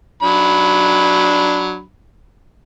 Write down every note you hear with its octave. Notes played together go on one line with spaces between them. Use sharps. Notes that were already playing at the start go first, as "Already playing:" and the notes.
F#3 D4 B5